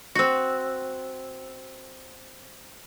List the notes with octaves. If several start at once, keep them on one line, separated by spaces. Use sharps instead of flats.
C4 F#4